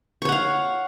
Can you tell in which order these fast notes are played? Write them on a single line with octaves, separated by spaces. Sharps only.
C#6 C#5 F#5 F5